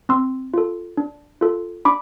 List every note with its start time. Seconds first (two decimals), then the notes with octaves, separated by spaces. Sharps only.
0.09 C4 C6 E6
0.54 F4 A4
0.97 D4
1.41 F4 A4
1.85 D4 B5 D6